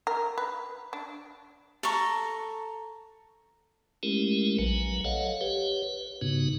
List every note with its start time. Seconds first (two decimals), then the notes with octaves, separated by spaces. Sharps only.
0.07 A#4
0.38 B4
0.93 D4
1.83 A4 A#5 C#6
4.03 G#3 A3 C#4 E4 G4 A#4
4.59 A#1 F#3 B4 G#5
5.04 A4 C#5 D#5 F5 F#5
5.41 G4 B4 C#5
5.83 B4
6.21 G#2 C#3 B3 D#4 F#4